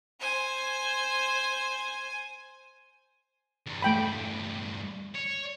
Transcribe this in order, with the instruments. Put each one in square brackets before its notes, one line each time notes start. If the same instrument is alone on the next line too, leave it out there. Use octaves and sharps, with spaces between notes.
[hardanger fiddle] C5 G#5
[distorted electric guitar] E2 G2
[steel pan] A3 G5 B5
[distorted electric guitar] C#5